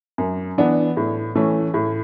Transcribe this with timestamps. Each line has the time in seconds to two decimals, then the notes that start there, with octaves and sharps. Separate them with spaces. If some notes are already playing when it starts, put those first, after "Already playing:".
0.18 F#2
0.58 E3 B3 D4
0.97 A2
1.36 E3 A3 C#4
1.74 A2